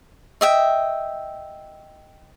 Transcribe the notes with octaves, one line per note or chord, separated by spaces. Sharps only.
D#5 E5 G5